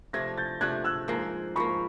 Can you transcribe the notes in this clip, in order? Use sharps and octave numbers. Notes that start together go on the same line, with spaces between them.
C3 F3 A3 D4 G#6 A#6
G6 A6
C3 F3 A3 D4 F#6 G#6
E6 F#6
G#2 F3 A#3
G#2 F3 A#3 B5 C#6